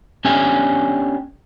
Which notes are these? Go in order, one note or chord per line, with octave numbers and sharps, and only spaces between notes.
B3 C#4 D4 G4 G#5